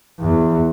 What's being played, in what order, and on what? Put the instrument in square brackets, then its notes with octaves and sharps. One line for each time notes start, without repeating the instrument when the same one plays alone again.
[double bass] E2